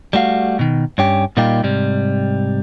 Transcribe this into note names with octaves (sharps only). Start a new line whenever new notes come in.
G3 A3 F#4 F5
B2 D#3
G2 C#4 G4
A#2 G3 A#3 D#4 F4 G4
G#2 C3 G3